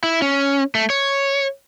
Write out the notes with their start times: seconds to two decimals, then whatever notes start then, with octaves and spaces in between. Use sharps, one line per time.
0.03 E4
0.22 C#4
0.75 A3
0.90 C#5